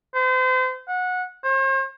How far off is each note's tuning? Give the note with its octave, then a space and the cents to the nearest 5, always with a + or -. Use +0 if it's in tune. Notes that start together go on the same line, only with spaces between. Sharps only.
C5 -35
F#5 -20
C5 +45